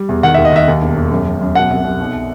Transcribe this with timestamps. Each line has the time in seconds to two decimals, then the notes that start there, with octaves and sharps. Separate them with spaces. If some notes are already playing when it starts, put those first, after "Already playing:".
Already playing: G3
0.09 E2
0.23 D#3 F#5
0.34 D#2 E5
0.45 D#5
0.52 D#3 E5
0.68 D#2
0.82 E1
0.97 E1
1.11 F#2
1.27 F#2
1.41 F#2
1.55 B2 F#5
1.70 C2
1.84 C2
2.00 B1